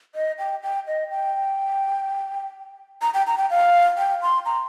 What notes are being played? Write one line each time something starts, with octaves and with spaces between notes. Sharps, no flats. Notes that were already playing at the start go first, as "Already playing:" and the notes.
D#5
G5
G5
D#5
G5
A#5
G5
A#5
G5
F5
G5
C6
A#5